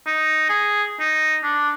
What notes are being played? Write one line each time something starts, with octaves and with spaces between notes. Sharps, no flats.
D#4
G#4
D#4
D4